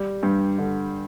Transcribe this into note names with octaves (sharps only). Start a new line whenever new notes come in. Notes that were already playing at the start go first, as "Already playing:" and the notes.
Already playing: G3
G2
D3